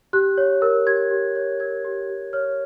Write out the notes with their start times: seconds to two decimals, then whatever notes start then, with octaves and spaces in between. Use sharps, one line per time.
0.13 G4 F#6
0.38 C#5
0.62 A#4
0.86 G4 G#6
1.11 G4
1.36 C#5
1.60 A#4 G#6
1.85 G4
2.09 G4
2.33 C#5 F6